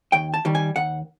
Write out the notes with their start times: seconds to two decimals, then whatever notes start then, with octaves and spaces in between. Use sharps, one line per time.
0.12 D#2 G5
0.34 A5
0.45 D#3 G3
0.55 G#5
0.76 D#2 F#5